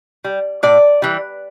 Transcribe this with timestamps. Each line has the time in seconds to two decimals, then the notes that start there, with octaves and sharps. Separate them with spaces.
0.24 G3
0.63 A2 D5
1.02 E3 G3